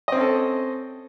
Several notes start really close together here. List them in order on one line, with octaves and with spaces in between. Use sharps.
D#5 C4 C#4 A4